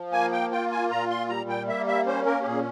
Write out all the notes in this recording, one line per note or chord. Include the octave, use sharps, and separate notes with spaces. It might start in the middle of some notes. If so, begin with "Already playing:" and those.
Already playing: F3
A#3 G#5
G5
F4 G5
G#5
A#2 A#5
C6
G3 A#5
G5
A#3 E5
E5
C#4 C5
A#4
G4
A#2 G#4